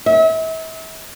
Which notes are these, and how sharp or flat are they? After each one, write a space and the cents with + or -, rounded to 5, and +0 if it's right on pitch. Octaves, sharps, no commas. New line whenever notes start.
E5 -40